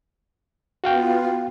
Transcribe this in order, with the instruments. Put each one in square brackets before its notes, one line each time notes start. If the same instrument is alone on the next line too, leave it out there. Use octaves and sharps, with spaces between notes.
[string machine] B3 F4 [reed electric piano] F#4 F5 G5